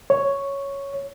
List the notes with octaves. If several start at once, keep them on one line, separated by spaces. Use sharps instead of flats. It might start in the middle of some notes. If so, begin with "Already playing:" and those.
C#5